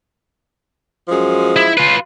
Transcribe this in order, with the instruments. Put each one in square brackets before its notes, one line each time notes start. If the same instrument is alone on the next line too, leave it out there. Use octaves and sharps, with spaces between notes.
[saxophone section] F#2 F3 G#3
[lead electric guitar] E4
F4 B4